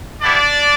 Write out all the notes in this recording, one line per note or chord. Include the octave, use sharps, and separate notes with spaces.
B3 D4 E4 G4 D5